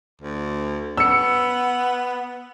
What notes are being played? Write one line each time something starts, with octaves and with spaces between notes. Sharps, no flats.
D2
B3 E6 C#7